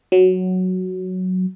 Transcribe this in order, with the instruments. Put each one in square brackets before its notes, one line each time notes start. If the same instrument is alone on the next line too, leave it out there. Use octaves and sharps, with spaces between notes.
[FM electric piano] F#3